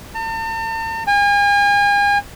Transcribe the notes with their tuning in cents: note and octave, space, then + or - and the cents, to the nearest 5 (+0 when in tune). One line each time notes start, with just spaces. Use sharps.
A5 +45
G#5 -40